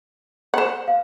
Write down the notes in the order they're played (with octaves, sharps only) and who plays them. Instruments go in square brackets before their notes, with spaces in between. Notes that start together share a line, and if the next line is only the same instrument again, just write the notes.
[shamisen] C5 F#5
[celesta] F5